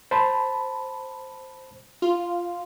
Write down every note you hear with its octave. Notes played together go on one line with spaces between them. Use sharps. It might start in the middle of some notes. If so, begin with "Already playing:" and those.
C5 A5 B5
F4